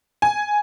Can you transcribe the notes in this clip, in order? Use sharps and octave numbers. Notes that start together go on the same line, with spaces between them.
G#5